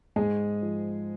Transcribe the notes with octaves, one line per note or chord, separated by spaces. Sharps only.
G#2 G#3 G#4
F3